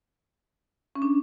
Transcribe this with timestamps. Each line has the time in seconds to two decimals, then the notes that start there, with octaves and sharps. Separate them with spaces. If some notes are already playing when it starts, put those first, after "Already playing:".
0.95 C#4
1.02 D4